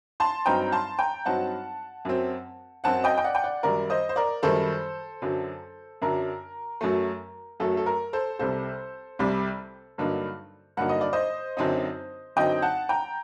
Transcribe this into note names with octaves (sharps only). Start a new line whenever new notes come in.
A5 C6
G2 F#3 C4 D#4 G5 A#5
A5 C6
G5 A#5
G2 F#3 C4 D#4 F#5 A5
F#2 F#3 C4
F#2 F#3 C4 F#5 A5
D#5 G5
G5
D5 F#5
G5
D5 F#5
F#2 D#3 G3 A#4 D5
C5 D#5
C5
A#4 D5
F#2 D#3 G3 A4 C5
F#2 D3 F#3
F#2 D3 F#3 A#4
F#2 F#3 A3
F#2 F#3 A3 A4
A4
A#4
A4 C5
C2 C3 G3 A4 C5
C2 C3 G3
G2 D3 F#3 A#3 D#4
G2 D3 F#3 A#3 D#4 F#5
D#5
D5
C5 D#5
F#2 D3 F#3 C4 D#4
F#2 D3 F#3 C4 D#4 D#5 G5
F#5 A5
G5 A#5